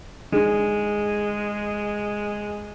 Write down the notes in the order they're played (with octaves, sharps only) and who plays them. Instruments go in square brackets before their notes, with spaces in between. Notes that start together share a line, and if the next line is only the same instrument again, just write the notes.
[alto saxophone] G#3 [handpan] D4 D#4 G#4